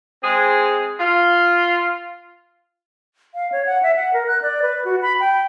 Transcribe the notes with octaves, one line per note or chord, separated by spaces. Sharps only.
G#3 C4 G#4
F4
F5
C#5
F#5
E5
F#5
A#4
F#6
D5
B4
F#4
B5
G5